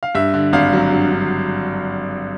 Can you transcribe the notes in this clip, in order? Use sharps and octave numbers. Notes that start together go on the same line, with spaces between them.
F5
G2 E5
D3
G#1 F5
F#3
G2
D3